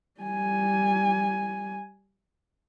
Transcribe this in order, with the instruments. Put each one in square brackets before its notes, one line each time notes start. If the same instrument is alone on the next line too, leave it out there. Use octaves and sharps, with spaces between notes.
[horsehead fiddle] G3 G#5